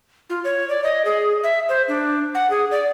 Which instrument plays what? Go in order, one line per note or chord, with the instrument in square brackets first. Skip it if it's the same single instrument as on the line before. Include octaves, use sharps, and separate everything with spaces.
[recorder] F4
C#5
D5
D#5
G#4
E5
C5
D4
F#5
G#4
D5